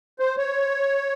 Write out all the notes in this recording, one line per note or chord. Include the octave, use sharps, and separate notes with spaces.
C5
C#5